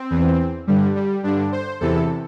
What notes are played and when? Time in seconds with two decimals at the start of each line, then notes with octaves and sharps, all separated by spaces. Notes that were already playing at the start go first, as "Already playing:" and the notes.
Already playing: C4
0.11 E2 E3
0.67 G2 D3 G3
0.95 G3
1.23 G2 D3 D4
1.52 C5
1.80 E2 C3 E3 A4